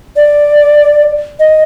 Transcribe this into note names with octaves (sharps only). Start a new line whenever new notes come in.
D5
D#5